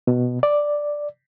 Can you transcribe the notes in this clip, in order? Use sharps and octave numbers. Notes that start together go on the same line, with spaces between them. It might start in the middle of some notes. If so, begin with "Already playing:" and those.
B2
D5